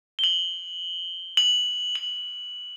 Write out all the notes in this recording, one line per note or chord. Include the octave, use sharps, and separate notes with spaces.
G7
F#7
F#7
F#7